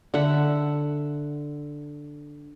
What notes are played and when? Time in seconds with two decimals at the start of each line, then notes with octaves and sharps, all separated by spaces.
0.14 D3 E5 F#5